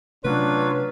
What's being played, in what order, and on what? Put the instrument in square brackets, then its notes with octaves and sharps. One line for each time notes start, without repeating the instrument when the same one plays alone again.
[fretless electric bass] C3 A3 C#4 [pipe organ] F#3 F4 [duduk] D4 [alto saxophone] B4